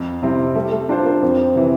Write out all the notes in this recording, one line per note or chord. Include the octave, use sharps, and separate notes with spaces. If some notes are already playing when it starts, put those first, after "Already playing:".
Already playing: F2
C3 G3 C4 E4
G3 A3
A3
G3 D4 F4 C5
A#3
F2 C4
C3 E3